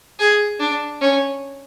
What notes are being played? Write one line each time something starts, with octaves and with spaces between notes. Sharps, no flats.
G#4
D4
C#4